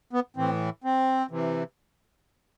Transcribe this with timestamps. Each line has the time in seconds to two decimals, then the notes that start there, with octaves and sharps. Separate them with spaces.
0.13 B3
0.36 A2 E3 C4
0.84 C4
1.31 C3 E3